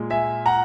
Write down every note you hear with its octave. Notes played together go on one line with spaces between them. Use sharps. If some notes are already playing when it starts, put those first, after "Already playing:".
Already playing: A#2 G#3
E5 G#5
F#5 A#5